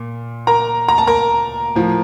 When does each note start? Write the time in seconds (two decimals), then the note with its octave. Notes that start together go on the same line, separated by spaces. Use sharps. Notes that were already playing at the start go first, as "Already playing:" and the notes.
Already playing: A#2
0.47 A#4 A#5
0.88 A#5
0.98 A5
1.07 A#4 A#5
1.76 A2 F3